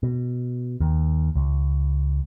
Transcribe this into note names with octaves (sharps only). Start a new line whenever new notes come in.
B2
D#2
C#2